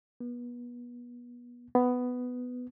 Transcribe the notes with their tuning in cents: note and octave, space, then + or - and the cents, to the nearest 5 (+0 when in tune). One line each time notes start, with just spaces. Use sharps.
B3 -30
B3 +10